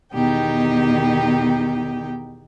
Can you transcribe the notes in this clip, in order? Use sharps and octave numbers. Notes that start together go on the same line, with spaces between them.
E2 B2 D#3 D#4 G4 G5